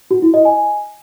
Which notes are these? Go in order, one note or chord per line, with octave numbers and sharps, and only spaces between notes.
F#4
E4
D#5
G#5